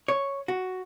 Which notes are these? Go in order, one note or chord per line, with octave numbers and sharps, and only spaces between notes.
C#5
F#4